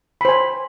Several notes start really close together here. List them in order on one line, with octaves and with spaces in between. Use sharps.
B5 C5 G#5